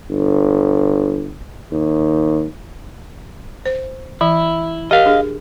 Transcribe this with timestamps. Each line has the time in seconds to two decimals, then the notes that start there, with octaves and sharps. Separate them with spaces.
0.11 G1
1.72 D#2
3.66 C5
4.21 E3 E4
4.91 G4 A#4 D#5 F5
5.06 D4 G#4